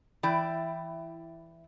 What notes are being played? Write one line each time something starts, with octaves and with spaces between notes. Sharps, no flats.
E3 E4 D5 G5